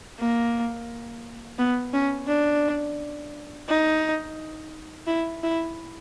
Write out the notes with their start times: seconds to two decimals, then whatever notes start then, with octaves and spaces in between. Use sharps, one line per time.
0.19 A#3
1.59 B3
1.94 C#4
2.28 D4
3.68 D#4
5.07 E4
5.43 E4